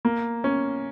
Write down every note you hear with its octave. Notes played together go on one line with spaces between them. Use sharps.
A#3
C#4